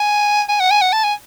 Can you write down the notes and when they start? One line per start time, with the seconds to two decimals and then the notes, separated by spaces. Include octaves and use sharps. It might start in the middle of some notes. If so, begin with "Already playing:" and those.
Already playing: G#5
0.49 G#5
0.60 F#5
0.71 G#5
0.82 F#5
0.93 A5
1.04 G#5